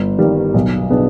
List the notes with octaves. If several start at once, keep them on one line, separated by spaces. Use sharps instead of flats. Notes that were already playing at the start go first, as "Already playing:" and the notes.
Already playing: G1
G2 D#3 G3
B1
B2 B3 D4 G#4